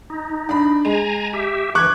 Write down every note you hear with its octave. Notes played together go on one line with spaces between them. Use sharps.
D#4
D4 B5
G#3 G#5 A#5
G4 E5
E3 C#6 D6 F#6 G#6